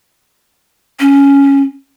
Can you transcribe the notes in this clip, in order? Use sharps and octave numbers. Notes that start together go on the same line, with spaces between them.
C#4